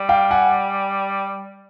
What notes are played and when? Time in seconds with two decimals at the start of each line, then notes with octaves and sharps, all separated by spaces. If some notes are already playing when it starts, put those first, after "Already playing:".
Already playing: G3
0.09 F5 G5
0.31 F#5 G#5